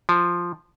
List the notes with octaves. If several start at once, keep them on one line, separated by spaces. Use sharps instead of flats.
F3